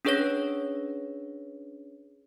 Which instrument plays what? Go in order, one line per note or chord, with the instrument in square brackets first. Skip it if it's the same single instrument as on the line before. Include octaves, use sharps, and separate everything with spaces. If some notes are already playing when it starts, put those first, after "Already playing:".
[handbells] C#4 D4 G#4 B4 C#5 A#6